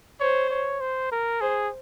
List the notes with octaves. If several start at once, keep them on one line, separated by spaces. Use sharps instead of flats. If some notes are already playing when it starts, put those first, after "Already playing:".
C5 C#5
C#5
C5
A#4
G#4 C5